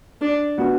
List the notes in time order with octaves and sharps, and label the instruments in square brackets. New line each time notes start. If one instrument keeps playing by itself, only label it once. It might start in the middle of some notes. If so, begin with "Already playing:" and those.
[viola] D4
[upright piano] D3 B3 F#4